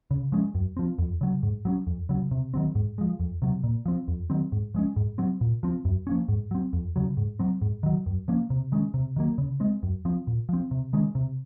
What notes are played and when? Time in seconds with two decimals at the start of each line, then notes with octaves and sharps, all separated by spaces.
0.11 C#3
0.32 F3 G#3 C#4
0.55 F#2
0.77 F3 C4
0.99 F2
1.21 C#3 F#3
1.43 G#2
1.65 F#3 A#3 C#4
1.87 F2
2.09 C#3 F#3
2.31 C3
2.54 D#3 F#3 C4
2.75 G#2
2.98 F3 G#3
3.20 F2
3.42 C3 F#3
3.64 A#2
3.86 F3 C4
4.08 F2
4.30 D#3 F#3 C4
4.52 G#2
4.74 F3 G#3 C#4
4.96 G#2
5.18 F#3 C4
5.41 A#2
5.63 F3 C4
5.85 F#2
6.07 F3 A#3 C#4
6.29 G#2
6.51 F#3 C4
6.73 F2
6.96 C#3 F#3
7.17 G#2
7.39 F#3 C4
7.62 G#2
7.83 D#3 F#3
8.06 F#2
8.28 F3 A#3 C#4
8.50 C3
8.72 D#3 G#3 C#4
8.94 C3
9.16 D#3 F#3 A#3
9.38 C#3
9.60 G#3 C4
9.83 F#2
10.05 F3 C4
10.27 A#2
10.49 F3 C4
10.71 C3
10.93 D#3 G#3 C#4
11.15 C3